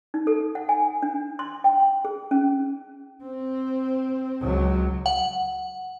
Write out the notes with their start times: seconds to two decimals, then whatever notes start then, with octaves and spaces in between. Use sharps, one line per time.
0.14 D#4
0.27 A4
0.55 F#5
0.69 G#5
1.03 D4
1.39 C6
1.64 G5
2.05 G#4
2.31 C#4
3.22 C4
4.41 C#2 F#3
5.06 F#5